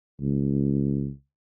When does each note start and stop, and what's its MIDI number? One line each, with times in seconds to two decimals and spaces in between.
0.21 1.10 37